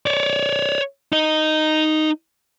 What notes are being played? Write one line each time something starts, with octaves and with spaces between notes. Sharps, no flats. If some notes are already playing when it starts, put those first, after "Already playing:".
C#5 D5
D#4 D#5